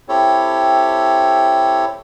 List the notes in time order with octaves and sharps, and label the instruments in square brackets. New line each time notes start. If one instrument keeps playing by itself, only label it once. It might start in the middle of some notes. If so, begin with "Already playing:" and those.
[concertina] C4 E4 G4 A4 C#5